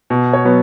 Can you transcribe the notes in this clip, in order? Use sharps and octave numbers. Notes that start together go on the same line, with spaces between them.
B2
C#5
F#3 B3